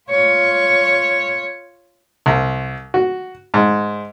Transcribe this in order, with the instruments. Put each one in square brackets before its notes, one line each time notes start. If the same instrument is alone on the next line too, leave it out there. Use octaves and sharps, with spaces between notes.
[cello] F4 C#5
[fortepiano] C2
F#4
G#2